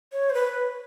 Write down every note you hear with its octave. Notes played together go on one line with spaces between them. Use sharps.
C#5
C5
B4